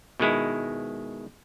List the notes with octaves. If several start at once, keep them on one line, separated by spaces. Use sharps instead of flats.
B2 D#3 G#3 E4